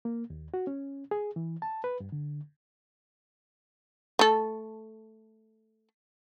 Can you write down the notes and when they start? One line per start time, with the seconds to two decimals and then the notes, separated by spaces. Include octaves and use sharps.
0.05 A#3
0.30 D#2
0.54 F#4
0.67 C#4
1.11 G#4
1.36 E3
1.62 A5
1.84 B4
2.00 G2
2.12 D3
4.19 A3 A4